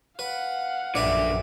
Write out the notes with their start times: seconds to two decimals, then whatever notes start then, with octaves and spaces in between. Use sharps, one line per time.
0.19 B4 F5 F#5
0.95 A#1 F#2 D3 B4 D5 E5